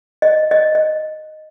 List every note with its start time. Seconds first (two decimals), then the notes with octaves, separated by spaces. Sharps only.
0.22 D#5
0.51 D#5
0.75 D#5